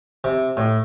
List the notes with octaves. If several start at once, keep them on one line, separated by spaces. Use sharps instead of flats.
C3
A2